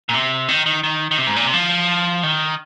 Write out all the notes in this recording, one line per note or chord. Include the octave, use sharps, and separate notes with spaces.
A#2
C3
D#3
D#3
D#3
D#3
C3
G#2
A#2
C3
F3
D#3